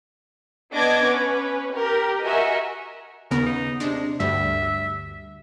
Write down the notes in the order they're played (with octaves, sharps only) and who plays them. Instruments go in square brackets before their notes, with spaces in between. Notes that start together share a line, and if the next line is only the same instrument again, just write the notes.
[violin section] B3 D4 D#5 D6 G#6 A#6
C#4 B4
G4 A#4
F#4 A#4 D#5 E5 G#5 C#6
[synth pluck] D#2 C#3 B3 [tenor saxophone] A#4
[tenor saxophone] D#4
[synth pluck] C3 D4 [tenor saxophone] G#3
[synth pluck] D2 G2 G3 [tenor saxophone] E5